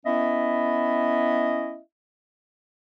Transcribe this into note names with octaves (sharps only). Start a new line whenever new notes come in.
B3 C#4 E4 D#5 E5